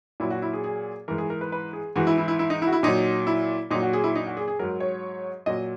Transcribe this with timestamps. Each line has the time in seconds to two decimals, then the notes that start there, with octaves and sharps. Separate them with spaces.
0.20 A#2 F#3 E4
0.31 F#4
0.42 E4
0.53 G#4
0.64 G#4
1.08 G#2 E3 A#4
1.18 G#4
1.30 A#4
1.41 B4
1.52 B4
1.73 G#4
1.96 G#2 E3 F#4
2.07 E4
2.18 E4
2.28 E4
2.39 E4
2.50 D#4
2.62 E4
2.67 F#4
2.72 E4
2.83 A#2 F#3 D#4
3.27 E4
3.71 A#2 F#3 D#4
3.82 F#4
3.93 G#4
4.04 E4
4.16 D#4
4.27 F#4
4.37 G#4
4.48 G#4
4.59 G#2 F#3 A#4
4.80 C#5
5.46 A#2 F#3 D#5